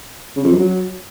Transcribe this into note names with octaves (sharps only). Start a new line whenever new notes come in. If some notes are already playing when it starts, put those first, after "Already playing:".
C#3
F2
F#2
F#3